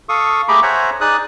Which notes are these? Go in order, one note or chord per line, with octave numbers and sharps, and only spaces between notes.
A4 F5 C#6 D#6
A3 G4 G#4 A#5 B5 D6
C5 C#5 E5 F#5 G#5 A#5
D#4 G#4 D5 D#6 F#6